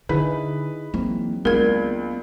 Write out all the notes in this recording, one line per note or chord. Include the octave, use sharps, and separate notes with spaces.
D3 D#4 E4 G#4 B4
E3 F#3 A#3 C4
C#2 A#3 B3 D4 A#4 G#6